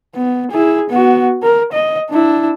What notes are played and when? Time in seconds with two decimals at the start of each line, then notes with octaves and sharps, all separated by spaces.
0.15 B3
0.51 E4 G#4
0.90 B3 F#4
1.43 A#4
1.73 D#5
2.11 D4 E4